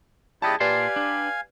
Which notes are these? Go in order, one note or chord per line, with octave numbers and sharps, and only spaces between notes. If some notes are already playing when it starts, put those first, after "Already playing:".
C#2 B3 E4 G4 G#4 D5 D#5 A5
A#2 G4 B4 D5 F5 G#5 A5 C6
D4